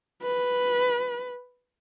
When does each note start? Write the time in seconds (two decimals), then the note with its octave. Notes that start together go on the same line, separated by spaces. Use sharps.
0.22 B4